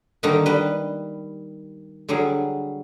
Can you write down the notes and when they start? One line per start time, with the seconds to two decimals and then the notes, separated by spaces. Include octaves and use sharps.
0.23 D3 D#3 G3 A#3 D4 D#4
0.46 G3 B4 D#5
2.09 D3 F#3 G3 G#4